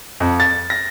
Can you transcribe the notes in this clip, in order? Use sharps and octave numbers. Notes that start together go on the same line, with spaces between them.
F2
A6
A#6